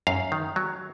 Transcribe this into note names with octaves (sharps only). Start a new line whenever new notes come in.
F#2 F5
D#3
F#3